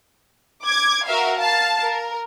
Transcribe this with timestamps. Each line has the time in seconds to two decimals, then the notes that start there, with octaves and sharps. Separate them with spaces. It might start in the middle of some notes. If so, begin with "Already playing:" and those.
0.64 D6 G#6
1.07 F#4 A#4 E5 F5
1.37 F5 A5
1.82 A#4